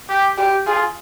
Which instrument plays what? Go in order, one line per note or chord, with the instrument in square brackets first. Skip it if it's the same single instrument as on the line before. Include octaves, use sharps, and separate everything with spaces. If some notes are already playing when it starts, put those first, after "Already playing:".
[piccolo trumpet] G4
[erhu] G4
[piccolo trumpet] F4 [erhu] G#4